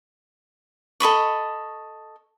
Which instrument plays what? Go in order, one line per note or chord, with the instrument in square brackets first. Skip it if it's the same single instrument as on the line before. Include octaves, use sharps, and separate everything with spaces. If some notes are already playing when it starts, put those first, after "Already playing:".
[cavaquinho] A4 D#5 B5 C#6